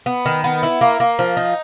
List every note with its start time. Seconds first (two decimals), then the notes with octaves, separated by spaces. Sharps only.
0.06 B3
0.26 D#3
0.44 B3
0.63 E4
0.81 A#3
1.00 A#3
1.19 F3
1.37 D#4